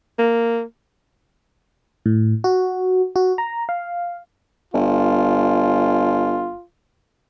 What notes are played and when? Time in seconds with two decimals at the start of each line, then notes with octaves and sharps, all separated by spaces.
0.18 A#3
2.06 A2
2.44 F#4
3.16 F#4
3.38 A#5
3.69 F5
4.74 G1 F4